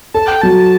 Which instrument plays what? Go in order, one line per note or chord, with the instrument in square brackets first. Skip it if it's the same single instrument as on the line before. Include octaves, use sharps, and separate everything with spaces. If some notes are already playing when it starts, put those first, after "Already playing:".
[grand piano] A4 [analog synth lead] A5
[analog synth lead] G5
[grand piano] F#3 [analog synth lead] A5